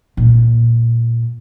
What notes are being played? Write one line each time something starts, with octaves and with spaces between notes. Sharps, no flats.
A#2